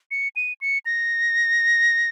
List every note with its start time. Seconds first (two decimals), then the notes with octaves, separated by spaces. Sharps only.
0.11 C#7
0.36 D#7
0.61 C#7
0.86 A#6